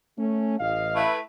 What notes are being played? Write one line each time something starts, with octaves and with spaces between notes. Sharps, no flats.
A3 C#4
A1 D#5 F5
A3 E4 B4